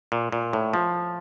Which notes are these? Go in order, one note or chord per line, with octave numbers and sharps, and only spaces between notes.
A#2
A#2
A2
F3